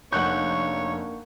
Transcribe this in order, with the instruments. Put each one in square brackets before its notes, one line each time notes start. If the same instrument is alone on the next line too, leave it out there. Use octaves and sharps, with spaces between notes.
[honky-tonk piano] F1 F#6 G6 [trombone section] A#3 D4 [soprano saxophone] C#5 [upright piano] F#5 C#6